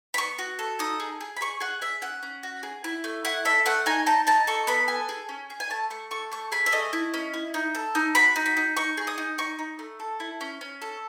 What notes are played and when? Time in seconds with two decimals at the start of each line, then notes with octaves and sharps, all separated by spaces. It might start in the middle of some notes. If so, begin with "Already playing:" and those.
0.14 B5
0.17 B3 C#6
0.39 F#4
0.59 A4
0.79 D#4 D#6
1.00 G#4
1.21 G#4
1.37 B5
1.41 G#4 C#6
1.60 G#4 F#5
1.81 G#4 E5
2.02 C#4 F#5
2.23 C#4
2.43 F#4
2.63 G#4
2.84 E4
3.04 A3
3.25 E4 F#5
3.45 A4 E5
3.66 A3 F#5
3.86 D#4 G#5
4.06 D#4 A5
4.27 D#4 A5
4.47 A4 C#6
4.67 B3 B5
4.88 A4 G#5
5.09 G#4
5.29 C#4
5.50 G#4
5.60 G#5
5.70 A3 A5
5.90 A3 C#6
6.11 A4 C#6
6.32 A3 C#6
6.52 G#4 B5
6.66 E5
6.72 A3 D#5
6.93 E4
7.14 C#4
7.34 E4
7.54 D#4
7.75 A4
7.95 D#4
8.15 F#4 B5
8.36 D#4
8.46 B5
8.57 D#4
8.77 D#4 C#6
8.97 G#4
9.07 D#6
9.18 D#4
9.38 D#4 C#6
9.59 D#4
9.79 A3
10.00 A4
10.20 E4
10.41 C#4
10.61 C#4
10.82 A4